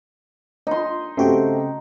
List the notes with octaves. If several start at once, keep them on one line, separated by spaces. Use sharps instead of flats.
D#4 C6
C#3 A3 C4 F#4 G4 G5